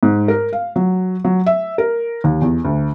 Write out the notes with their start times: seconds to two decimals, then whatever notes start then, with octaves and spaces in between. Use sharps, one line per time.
0.03 G#2
0.28 A#4
0.53 F5
0.76 F#3
1.24 F#3
1.46 E5
1.78 A#4
2.24 D#2
2.42 E2
2.65 D2